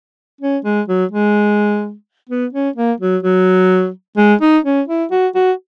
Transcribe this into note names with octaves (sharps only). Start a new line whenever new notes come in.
C#4
G#3
F#3
G#3
B3
C#4
A#3
F#3
F#3
G#3
D#4
C#4
E4
F#4
F#4